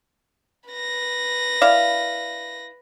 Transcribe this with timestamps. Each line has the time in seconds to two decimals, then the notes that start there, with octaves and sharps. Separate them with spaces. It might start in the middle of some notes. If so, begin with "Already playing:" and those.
0.70 B4 A#6
1.61 E4 D5 F5